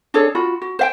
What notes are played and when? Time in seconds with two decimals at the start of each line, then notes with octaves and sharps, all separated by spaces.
0.14 D4 G#4 A4 C#5
0.35 F4 F#4 B5
0.62 F#4
0.79 C5 F5 G5